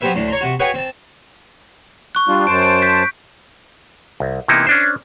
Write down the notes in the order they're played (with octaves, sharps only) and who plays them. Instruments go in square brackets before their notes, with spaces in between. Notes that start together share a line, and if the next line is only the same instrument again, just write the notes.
[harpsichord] F#3 B3 C4 G4 B4 E5
D2 A2 D4
C#5 A#5 C6
C3 F#4
F#4 G#4 B4 C#5 F#5 G5
C4 A5
[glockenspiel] C#6 F#6
[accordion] G3 D4 F4
[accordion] F#2 C5 A5 [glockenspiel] D7
[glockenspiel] D7
G6 B6
[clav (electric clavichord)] C2
C3 E3 A#3 B3 D#4 E4
C#4 D4 C5